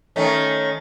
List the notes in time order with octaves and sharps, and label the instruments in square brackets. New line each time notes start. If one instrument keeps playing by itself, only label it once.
[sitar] D#3 A3 C#4